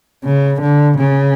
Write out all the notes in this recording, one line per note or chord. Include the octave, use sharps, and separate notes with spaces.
C#3
D3
C#3